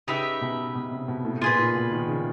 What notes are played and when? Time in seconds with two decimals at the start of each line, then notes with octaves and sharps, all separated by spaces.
0.07 C#3 D#4 G4 B4 E5
0.41 B2
0.75 B2
0.91 C3
1.08 B2
1.25 A2
1.42 A#2 F4 G#4 B4
1.59 A#2
1.75 B2
1.91 D#3
2.08 C#3